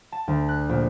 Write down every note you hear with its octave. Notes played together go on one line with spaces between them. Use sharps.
A5
D2
F#6
A#1